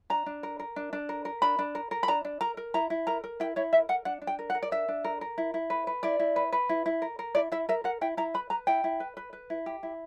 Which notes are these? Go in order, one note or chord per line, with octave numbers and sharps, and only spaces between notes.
D4 A#5
D4
A#4
A#4
D4
D4
A#4
A#4
D4 B5
D4
A#4
A#4
B5
D4 A#5
D4
A#4 A#5
A#4
E4 A#5
E4
A#4 A#5
A#4
E4 G5
E4 C#5
A#4 E5
A#4 F#5
D4 F#5
D4
G5
A#4
F#5
A#4
D5
D4 E5
D4
A#4
A#4
E4
E4
B4
B4
E4 D5
E4
B4
B4
E4
E4
A#4
A#4
E4 D5
E4 E5
A#4 E5
A#4 F#5
E4 G5
E4 A#5
B4 B5
B4 A#5
E4 G5
E4
B4
B4
B4
E4
G4
E4